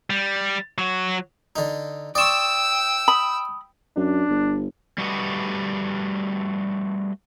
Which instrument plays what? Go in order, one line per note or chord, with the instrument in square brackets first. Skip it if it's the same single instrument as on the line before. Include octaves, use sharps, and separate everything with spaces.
[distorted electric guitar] G3
F#3 F#4
[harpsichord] D3 D#4
[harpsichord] D5 C6 C#6 [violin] G5 E6 [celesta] D#6 E7
[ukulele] B5 [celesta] D#6
[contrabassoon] F#2 [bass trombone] D4
[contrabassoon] G1
[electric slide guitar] G3 A3 F#4 G4 B4 D#5